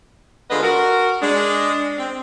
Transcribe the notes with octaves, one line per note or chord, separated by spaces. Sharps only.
D3 G#3 F4 G#4 B4 D#5
F#4 A#4
G#3 D4
C4